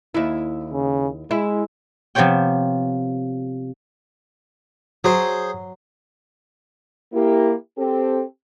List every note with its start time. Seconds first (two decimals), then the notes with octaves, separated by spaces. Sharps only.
0.14 D#2 E4
0.72 C#3
1.31 G#3 E4
2.15 C3 F3 B3 G4 C#5 G5
5.04 F#3 G#4 C5
7.14 A#3 E4 G4
7.77 C4 G4 A4